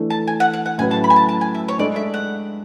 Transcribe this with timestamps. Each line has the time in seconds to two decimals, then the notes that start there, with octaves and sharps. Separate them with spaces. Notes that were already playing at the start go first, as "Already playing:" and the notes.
Already playing: E3 A3 D4
0.10 A5
0.28 G#5
0.40 F#5
0.54 F#5
0.66 F#5
0.78 A2 F#3 C#4 E4 B4 G#5
0.91 A5
1.04 B5
1.10 G#5
1.16 A5
1.29 A5
1.41 G#5
1.55 E5
1.68 C#5
1.79 G#3 D4 A4 D5
1.96 E5
2.14 F#5